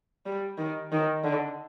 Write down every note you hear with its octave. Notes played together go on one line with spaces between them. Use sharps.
G3
D#3
D#3
D3